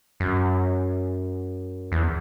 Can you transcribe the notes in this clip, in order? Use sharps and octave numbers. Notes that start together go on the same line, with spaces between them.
F#2
E2